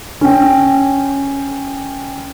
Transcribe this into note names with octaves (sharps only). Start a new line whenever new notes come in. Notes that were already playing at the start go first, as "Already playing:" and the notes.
C#4 G5